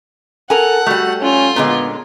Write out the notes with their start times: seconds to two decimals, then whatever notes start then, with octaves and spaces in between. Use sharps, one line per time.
0.50 A4 A#4 F#5 G#5
0.87 G3 A3 F#4
1.22 C#4 F4
1.56 A#2 D3 G#3 B3